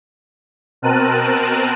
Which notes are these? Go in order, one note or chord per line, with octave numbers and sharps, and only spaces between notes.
B2 C4 A#4 A5 F#6 D#7